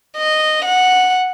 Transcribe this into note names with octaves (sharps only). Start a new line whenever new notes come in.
D#5
F#5